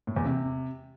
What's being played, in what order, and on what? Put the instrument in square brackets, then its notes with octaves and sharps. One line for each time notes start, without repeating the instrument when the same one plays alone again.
[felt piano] A2
E2
C3